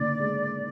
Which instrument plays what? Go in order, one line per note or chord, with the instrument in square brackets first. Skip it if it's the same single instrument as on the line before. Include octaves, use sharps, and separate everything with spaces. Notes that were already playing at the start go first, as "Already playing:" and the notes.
Already playing: [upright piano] F#1 D3 [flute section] D5
[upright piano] G#3